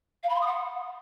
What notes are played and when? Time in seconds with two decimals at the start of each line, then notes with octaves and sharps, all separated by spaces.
0.23 F5
0.29 B5
0.35 C6
0.41 D#6
0.47 F#5